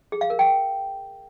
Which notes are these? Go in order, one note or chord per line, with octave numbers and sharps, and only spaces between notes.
G#4
F5
A#4
G5